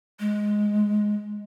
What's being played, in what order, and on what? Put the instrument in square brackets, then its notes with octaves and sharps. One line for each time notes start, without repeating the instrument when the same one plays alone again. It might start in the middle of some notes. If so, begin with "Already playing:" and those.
[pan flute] G#3